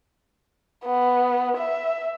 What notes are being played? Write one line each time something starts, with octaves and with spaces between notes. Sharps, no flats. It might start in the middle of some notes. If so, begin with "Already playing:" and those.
B3
E5